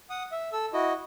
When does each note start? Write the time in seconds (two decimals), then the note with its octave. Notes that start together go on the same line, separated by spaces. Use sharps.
0.10 F#5 D#6
0.32 E5
0.52 A4 E6
0.73 E4 F#4 D#5